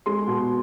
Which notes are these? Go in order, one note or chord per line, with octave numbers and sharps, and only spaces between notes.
G#3 C6
B2